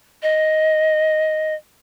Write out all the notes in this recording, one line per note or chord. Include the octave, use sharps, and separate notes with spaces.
D#5